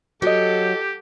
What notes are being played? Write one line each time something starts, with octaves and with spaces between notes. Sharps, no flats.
F#3 F#4 G4 A4 D#5